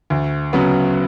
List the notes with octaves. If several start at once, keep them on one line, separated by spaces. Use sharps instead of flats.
D2
C#3 F#3 B3